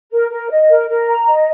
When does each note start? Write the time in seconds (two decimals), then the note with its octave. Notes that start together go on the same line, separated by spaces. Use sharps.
0.12 A#4
0.31 A#4
0.51 D#5
0.70 A#4
0.89 A#4
1.09 A#5
1.27 D#5